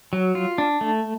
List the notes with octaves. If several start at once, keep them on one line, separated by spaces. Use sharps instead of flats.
F#3
F4
D4
A3